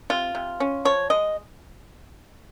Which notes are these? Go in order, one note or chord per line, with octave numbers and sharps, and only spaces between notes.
C3 F4
C3
C#4
F3 C#5
G#3 D#5